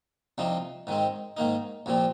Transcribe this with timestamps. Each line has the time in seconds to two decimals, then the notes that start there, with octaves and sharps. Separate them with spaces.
0.38 C2 C3 F3 C4 D#4
0.87 G#2 D#3 G#3 C4
1.37 G#2 D#3 A#3 D#4
1.86 C2 A#2 F3 C4